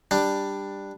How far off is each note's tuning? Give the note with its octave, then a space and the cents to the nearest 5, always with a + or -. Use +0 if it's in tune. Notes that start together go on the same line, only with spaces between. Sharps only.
G3 +10 D4 +10